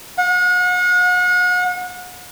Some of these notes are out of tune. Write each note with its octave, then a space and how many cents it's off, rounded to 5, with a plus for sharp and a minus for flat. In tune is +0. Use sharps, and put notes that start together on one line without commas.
F#5 -40